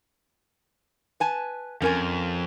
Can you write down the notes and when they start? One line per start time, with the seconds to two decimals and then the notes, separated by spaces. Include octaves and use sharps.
1.20 B4 G#5 A5
1.82 F2 C#4 A#4 G#5